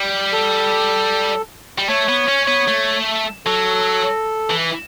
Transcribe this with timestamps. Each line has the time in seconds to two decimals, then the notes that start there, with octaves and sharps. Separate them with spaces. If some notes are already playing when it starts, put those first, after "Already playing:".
Already playing: G3
0.32 A4
1.78 G3
1.89 A3 C#5
2.08 B3
2.28 C#4
2.48 B3
2.68 A3
3.46 F#3 A4
4.50 E3